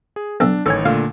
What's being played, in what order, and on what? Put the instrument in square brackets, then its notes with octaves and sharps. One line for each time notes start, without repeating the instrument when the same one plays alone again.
[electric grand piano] G#4
[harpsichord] B1 A4 [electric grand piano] D4
[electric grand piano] A1 D#3 C#5 [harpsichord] A4 G#5
[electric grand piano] A#2 D3 A3 [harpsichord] F5